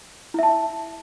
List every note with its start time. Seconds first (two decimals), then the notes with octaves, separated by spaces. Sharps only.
0.34 E4
0.39 E5
0.43 A5